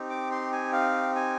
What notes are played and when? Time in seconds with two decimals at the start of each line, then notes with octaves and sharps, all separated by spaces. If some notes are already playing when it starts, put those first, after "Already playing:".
Already playing: C4 D#4 G4
0.10 D6
0.31 C6
0.52 G#5
0.73 F5
1.16 G#5